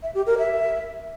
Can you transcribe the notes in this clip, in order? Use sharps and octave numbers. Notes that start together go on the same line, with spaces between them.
E5
G4
A#4
E5